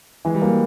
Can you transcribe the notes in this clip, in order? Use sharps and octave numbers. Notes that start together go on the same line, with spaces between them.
E3 G#3
G3
F#3 A#3